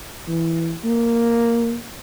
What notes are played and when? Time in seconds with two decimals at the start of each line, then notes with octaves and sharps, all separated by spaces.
0.28 E3
0.84 A#3